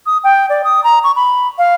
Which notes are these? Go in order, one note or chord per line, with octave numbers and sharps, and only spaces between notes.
D#6
G5
D5
D#6
A#5
C#6
B5
F5